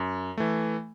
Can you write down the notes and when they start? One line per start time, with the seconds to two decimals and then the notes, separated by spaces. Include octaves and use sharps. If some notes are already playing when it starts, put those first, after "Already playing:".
Already playing: F#2
0.38 E3 A3